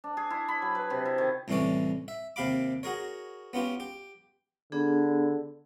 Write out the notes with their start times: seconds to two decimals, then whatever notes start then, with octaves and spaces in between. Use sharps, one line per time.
0.04 D4
0.17 G#4
0.30 E4
0.48 B5
0.62 F#3
0.75 B4
0.90 C3
1.05 E4
1.18 D#3
1.48 C2 A2 E3 C#4 C#5 D5
2.08 E5
2.36 D#2 C3 G4 F5 B5 D6
2.83 F#4 G#4 A#4 C#5
3.53 B3 C#4 F4 G4
3.80 G4
4.72 D3 B3 D4 G#4